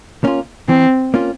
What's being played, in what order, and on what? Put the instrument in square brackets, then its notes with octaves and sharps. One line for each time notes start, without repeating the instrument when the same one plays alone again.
[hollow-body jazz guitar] A#3 C#4 F4
[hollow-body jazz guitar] E3 [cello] C4
[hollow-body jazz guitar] A#3 C#4 F4